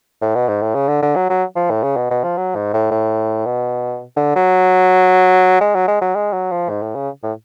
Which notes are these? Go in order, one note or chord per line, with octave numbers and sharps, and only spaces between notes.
A2
B2
G#2
A2
C#3
D3
D3
F#3
F#3
F3
A2
C#3
B2
B2
F3
F#3
G#2
A2
A2
B2
D3
F#3
G#3
F#3
G#3
F#3
G#3
F#3
F3
G#2
A2
C#3
A2